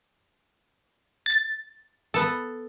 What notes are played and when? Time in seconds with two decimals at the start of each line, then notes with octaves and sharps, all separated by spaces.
1.26 A6
2.14 B3 A4